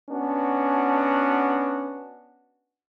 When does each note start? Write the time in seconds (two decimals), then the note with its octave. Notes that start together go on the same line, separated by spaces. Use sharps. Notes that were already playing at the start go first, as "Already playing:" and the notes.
0.10 B3 C#4 D4 F#4